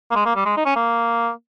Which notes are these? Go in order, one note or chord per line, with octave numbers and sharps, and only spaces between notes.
A#3
G#3
A#3
G3
G#3
D#4
C#4
A#3